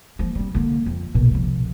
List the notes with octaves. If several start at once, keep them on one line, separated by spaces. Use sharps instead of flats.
F3 A#3
G3 C4
D3 A#3
F2
B1 A#2
C2 F3